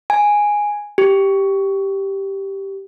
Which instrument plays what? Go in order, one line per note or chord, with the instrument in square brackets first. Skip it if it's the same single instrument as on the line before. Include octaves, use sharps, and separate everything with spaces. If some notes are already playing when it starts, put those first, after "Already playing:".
[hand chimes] G#5
G4